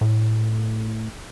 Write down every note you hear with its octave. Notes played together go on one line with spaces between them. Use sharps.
A2